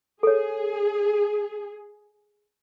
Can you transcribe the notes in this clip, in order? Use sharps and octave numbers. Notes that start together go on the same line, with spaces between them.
G#4 A4 C#5